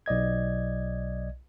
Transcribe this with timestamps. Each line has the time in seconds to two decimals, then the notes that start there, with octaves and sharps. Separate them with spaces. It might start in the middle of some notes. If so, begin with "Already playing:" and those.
0.06 B1 D5 D#5 G#6